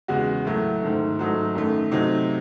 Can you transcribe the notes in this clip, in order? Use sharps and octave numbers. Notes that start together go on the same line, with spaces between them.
E2 C#3 G#3 F#4
A2 F#3 A3
G#2 D#3 A3
G#2 F#3 A3 D#4
F#2 D#3 A3
C3 F#3 A3 D#4